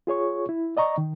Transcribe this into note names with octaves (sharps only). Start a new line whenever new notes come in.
F4 G#4 C#5 C#6
E4
D5 D#5 A#5 C#6
D#3